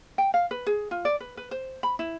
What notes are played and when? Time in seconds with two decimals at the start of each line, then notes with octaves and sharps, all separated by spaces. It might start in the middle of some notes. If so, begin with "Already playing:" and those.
0.18 G5
0.34 F5
0.51 B4
0.67 G#4
0.91 F4
1.05 D5
1.20 B4
1.37 B4
1.51 C5
1.83 B5
1.99 E4